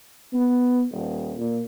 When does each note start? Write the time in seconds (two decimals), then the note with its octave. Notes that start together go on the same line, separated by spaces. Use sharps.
0.33 B3
0.91 D#1
1.37 A#2